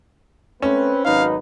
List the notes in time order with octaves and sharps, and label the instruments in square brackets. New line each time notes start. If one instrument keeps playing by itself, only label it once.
[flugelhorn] A3 [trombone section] C4 B4 [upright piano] C#4
[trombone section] G#1 F#3 B4 [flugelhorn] D#4 [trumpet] F5